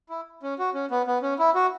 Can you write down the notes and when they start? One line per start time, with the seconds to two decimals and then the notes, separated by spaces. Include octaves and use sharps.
0.09 E4
0.43 C#4
0.59 F#4
0.74 C#4
0.91 B3
1.07 B3
1.22 C#4
1.39 E4
1.55 F#4